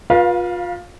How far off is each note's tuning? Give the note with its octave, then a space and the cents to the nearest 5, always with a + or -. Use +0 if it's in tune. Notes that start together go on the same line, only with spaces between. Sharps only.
F4 +25 B4 -35 F5 +0